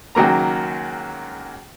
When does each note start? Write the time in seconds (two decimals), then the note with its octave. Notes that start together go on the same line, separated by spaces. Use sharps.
0.15 C#2 D#3 F#3 A#3 A#5